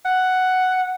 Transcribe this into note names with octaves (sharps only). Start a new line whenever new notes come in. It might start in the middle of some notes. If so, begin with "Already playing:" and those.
F#5